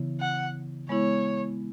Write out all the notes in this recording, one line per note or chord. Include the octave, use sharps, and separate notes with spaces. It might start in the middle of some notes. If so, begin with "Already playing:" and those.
Already playing: C#3 E3 B3 E4
F#5
G#3 B3 E4 C#5